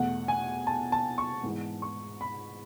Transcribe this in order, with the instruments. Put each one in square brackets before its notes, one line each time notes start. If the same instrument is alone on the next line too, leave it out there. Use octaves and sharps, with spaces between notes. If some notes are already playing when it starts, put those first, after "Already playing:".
Already playing: [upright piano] E2 B2 A3 F#5
G#5
A5
A5
C#6
G#2 E3 G#3 B3
C#6
B5